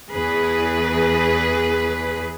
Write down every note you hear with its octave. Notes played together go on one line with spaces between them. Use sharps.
E2 G#4 B4